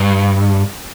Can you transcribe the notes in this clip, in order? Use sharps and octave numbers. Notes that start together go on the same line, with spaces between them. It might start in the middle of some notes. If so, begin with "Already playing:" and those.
Already playing: G2